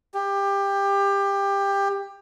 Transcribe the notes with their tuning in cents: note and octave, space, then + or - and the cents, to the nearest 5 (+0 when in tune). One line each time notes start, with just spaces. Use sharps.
G4 +20